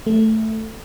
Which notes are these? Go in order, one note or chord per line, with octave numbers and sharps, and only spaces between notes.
A3